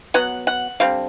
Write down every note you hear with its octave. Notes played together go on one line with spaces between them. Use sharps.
F#3 B3 F#5
F#5
D3 G3 C4 F5